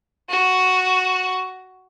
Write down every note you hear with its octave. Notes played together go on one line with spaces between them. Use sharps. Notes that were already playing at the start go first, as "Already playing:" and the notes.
F#4